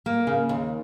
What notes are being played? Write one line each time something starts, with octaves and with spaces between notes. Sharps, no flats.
A#3
C#3
D#2